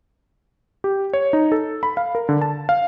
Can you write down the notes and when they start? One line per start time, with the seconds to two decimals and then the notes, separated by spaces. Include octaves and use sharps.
0.84 G4
1.13 C#5
1.33 D#4
1.52 A4
1.83 B5
1.97 F5
2.15 A#4
2.29 D3
2.42 A5
2.69 F5